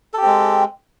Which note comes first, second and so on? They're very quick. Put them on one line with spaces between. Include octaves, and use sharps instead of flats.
A4 G4 C4 G#3